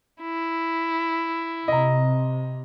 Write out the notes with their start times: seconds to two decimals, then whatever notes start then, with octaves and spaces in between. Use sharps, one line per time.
0.22 E4
1.68 C3 D#5 A#5